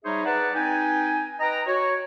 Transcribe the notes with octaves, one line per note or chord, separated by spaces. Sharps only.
G3 D#4 G#4 C5 C#5 E5
G#4 B4 D5 F#5 A5 A#5
C4 D#4 B4 G5 G#5
B4 D#5 G5 A#5
F#4 C#5